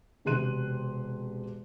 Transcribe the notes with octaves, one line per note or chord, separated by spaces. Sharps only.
E1 C3 G4 C6 F#6 D#7